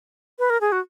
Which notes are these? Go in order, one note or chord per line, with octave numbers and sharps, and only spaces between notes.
B4
A#4
G#4
F#4